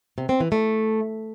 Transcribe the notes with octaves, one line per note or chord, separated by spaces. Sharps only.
C3
C4
E3
A3